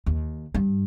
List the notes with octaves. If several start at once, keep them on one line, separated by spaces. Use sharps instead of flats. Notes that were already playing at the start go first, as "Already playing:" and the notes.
D#2
G2